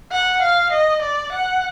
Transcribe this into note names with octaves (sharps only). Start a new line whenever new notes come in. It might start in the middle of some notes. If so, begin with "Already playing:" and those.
F#5
F5
D#5
D5
F#5